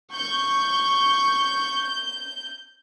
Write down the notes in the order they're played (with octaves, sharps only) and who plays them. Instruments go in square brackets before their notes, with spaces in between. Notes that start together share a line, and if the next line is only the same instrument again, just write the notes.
[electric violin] C#6 [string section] G6